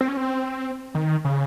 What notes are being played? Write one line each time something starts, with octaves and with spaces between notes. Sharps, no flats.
C4
C#4
C4
D#3
C#3